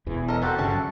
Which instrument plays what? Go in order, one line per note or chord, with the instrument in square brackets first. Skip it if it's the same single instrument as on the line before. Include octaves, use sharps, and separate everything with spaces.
[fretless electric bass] E1 E2 E3
[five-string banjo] A4 A#4 D#5
[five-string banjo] A#3 C4 G4 [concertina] F#4 A4
[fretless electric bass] G1 C#3 [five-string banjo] G3 E5 A5
[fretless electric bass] F#2